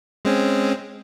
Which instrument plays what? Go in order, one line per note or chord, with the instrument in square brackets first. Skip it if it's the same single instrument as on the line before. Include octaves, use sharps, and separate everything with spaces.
[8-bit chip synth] G#3 C4 C#4